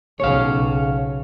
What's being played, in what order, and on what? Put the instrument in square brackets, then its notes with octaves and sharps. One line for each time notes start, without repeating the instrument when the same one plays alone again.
[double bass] B1 C#3 [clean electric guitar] C#5 F5